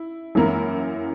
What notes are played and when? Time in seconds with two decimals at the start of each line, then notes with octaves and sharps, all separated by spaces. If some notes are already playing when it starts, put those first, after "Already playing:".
Already playing: E4
0.35 F#2 E3 A#3 E4 A#4